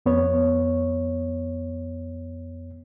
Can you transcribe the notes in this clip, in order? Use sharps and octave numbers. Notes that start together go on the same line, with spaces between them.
F2 B3 C#5